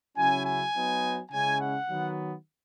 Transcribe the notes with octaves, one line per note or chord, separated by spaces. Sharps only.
C#3 F#3 C#4 E4 G#5
G#5
F#3 B3 D#4
C#3 G#3 C#4 E4 G#5
F#5
D#3 F#3 B3